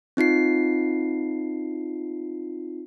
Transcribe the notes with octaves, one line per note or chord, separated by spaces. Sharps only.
C4 D#4 F4 C7